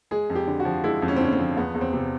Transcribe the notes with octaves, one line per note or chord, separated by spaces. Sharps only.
G#3 G#4
F2
G4
D3
F#4
F3
G#3 E4
F2
C#4
C4
D3 C#4
C4
F3
E2 B3
E2
C4
C3